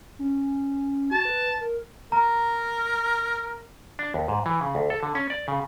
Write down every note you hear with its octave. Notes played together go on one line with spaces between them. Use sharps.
C#4
F#4 A5
B4
A#4
A#4 A#5
D4
D#2
G#2
E3
C#3
D2
A4
D3
C#4
D5
C#3